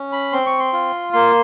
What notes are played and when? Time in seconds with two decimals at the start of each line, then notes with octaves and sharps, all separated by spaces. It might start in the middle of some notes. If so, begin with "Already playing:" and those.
Already playing: C#4
0.12 B5
0.32 C4 C6
0.46 C#6
0.60 C6
0.73 F4
1.13 A#3 C6